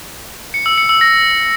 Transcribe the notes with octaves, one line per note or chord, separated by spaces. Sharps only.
C#7
E6
C#7
E6
A#6